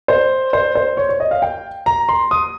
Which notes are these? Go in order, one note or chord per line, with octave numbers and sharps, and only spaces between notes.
C5
C5
C5
C#5
C#5
D#5
F5
G5
A#5
C6
D#6